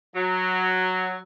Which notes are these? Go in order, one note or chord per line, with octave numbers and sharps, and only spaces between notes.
F#3